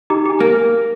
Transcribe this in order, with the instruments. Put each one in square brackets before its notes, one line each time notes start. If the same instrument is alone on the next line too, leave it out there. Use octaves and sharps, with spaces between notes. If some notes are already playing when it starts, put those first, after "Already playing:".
[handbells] D#4 G4
G4 G#5
[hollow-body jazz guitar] A#3